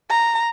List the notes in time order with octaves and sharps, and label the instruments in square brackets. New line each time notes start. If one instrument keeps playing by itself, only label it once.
[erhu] A#5